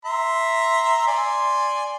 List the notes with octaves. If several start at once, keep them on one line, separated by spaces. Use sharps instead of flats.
E5 A#5 C6
D5 G#5 C6